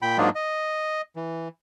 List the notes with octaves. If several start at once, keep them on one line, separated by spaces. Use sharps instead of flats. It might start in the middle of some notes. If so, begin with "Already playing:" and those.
A#2 G5 B5
G#2 F#3 A#3 D4 D#4 F4
D#5
E3